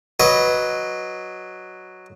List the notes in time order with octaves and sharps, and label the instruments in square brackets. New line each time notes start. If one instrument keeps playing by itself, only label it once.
[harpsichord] F#3 B4 D#5